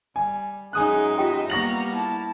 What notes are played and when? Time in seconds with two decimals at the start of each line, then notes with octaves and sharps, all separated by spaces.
0.16 G3 G#5
0.73 F#2 G#3 D#4 G#4 E5 G#5 D#6 F#6
1.18 F4 G4 D#5 E5 G5
1.50 G3 A#3 B3 A#5 C#6 A#6 F#7
1.93 E4 A5